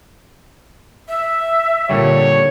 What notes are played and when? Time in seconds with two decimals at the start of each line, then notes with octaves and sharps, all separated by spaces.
1.08 E5
1.89 A#2 D3 G3 C#5